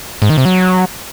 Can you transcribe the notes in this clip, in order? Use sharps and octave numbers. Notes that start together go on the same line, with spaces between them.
G#2
D#3
C3
F#3